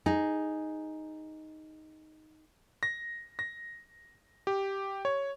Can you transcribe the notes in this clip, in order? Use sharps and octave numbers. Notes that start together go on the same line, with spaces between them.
D#4 G#4
A#6
A#6
G4
C#5